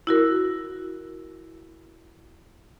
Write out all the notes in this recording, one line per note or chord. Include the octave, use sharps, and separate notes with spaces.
E4 F#4 A#4